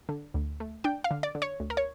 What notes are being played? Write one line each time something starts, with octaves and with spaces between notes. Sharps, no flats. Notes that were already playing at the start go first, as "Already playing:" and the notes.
D3
D2
A3
D4 G5
F5
D3
D5
D3
C#5
D2
A#4
C#5